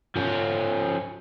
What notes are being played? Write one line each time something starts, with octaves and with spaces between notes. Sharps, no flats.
F3 C#4